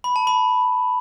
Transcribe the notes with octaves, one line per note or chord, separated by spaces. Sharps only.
B5
A5
B5